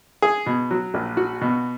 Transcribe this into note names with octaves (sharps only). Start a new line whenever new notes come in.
G#4
B2
F#3
A#1
F#4
B2